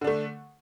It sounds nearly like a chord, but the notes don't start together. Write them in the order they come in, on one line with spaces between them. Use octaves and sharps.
D3 D4 A3